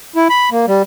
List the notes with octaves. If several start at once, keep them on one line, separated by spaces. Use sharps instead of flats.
E4
B5
A#3
G3